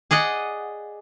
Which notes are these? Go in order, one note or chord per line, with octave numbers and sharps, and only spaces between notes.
G#4 D5 D#5 F#5